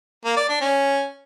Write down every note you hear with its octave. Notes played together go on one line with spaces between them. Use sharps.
A#3
D5
D4
C#4